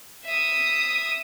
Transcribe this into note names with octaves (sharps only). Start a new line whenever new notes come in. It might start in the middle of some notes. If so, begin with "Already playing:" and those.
E5 D#6